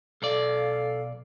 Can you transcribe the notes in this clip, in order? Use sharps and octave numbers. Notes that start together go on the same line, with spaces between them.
B1 A4 D5 F5